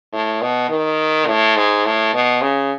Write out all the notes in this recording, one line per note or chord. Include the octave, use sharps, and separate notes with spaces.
A2
B2
D#3
A2
G#2
A2
B2
C#3